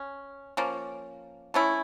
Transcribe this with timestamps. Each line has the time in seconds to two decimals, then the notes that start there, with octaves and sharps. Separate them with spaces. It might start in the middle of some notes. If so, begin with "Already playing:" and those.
Already playing: C#4
0.57 F3 A#3 C#4
1.54 A3 C#4 E4